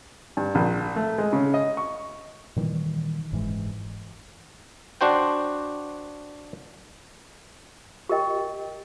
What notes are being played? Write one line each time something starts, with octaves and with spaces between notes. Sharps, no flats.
G2
A#1
A3
G#3
C#3
D#5
C#6
A#2 D#3 E3 G3
F#1 G#2 E3 G#3
D4 F#4 C5 G5
G4 A#4 D#5 G5